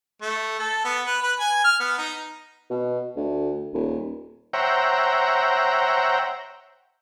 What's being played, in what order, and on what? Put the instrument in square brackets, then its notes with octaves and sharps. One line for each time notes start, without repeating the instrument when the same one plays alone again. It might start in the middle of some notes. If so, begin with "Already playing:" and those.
[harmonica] A3
A4
B3
B4
B4
G#5
F6
B3
D#4
[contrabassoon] B2
D2
D#1
[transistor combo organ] C5 C#5 E5 F#5 G5 A#5